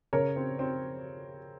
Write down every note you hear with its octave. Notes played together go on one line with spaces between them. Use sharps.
C#3 A#4 C#5
C4
C4